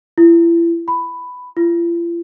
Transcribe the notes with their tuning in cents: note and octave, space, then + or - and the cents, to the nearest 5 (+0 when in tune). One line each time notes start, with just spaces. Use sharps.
E4 +35
B5 +10
F4 -45